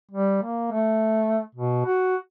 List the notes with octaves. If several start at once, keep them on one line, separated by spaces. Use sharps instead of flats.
G3
A#3
A3
B2
F#4